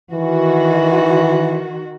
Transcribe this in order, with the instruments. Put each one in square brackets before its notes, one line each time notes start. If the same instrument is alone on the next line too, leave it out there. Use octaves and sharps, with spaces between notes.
[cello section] D#3 F#4 [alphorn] E3